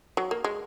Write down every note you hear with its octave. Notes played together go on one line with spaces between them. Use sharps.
F#3
A#3
G#3